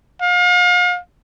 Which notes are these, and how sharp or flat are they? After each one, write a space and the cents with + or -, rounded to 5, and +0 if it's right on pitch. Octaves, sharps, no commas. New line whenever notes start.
F5 +40